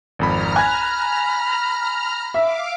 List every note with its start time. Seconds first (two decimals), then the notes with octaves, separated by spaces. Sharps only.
0.19 G#1 F2 A#5 B5 F6
0.56 G#5 B5 F#6 G#6
2.34 E5 F5 D6